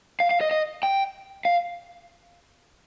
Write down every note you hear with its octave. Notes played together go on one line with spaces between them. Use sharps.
F5
F5
D#5
D#5
G5
F5